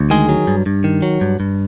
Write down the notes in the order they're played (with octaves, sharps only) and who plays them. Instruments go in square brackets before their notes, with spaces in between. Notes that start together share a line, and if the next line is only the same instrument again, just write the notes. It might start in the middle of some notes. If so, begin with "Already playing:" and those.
Already playing: [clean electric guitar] D2
D#3 G#3 G#4
F#3
G2
G2
D#3
F#3
G2
G2